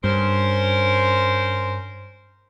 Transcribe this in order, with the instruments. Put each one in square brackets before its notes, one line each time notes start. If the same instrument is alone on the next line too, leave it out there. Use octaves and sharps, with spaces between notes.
[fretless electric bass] G2 [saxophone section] C#4 A#4 C5